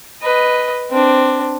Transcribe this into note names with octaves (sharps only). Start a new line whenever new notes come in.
B4 D#5
C4 D4